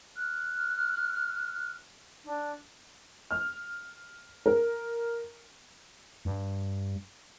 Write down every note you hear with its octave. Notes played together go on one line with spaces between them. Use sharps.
F6 F#6
D4
F6
A#4
G2